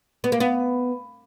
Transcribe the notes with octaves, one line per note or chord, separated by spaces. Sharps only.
B3
A#3
B3